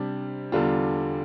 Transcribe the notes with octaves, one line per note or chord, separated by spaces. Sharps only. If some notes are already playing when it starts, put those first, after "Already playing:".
Already playing: C3 G3 D4
E2 D3 G3 D4 F4